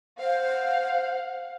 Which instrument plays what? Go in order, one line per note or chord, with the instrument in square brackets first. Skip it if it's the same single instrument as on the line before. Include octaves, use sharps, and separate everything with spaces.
[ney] C5 [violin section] F5 F#5